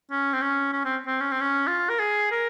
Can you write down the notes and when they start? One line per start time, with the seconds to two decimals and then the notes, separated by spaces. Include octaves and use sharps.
0.11 C#4
0.33 C4
0.42 C#4
0.73 C#4
0.85 C4
1.07 C4
1.21 C#4
1.31 C4
1.41 C#4
1.67 F4
1.89 A#4
1.99 G#4
2.31 A#4